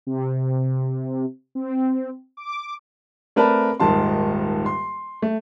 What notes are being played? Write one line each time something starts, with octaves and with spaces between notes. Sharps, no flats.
C3
C4
D6
A3 C4 A#4 B4 D5 A5
D#1 G#2 D#3 A5 C6
C6
A3